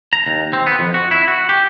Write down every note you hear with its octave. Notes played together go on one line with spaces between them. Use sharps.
A#5
D#2
C4
B3
F2
F#4
E4
F#4
G4